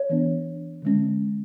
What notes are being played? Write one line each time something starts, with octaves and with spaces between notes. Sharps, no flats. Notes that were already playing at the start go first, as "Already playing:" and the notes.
Already playing: C#5
E3 B3 D4
D3 G#3 C#4